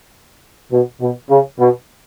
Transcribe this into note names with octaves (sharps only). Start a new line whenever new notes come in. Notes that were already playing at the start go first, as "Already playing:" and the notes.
B2
B2
C#3
B2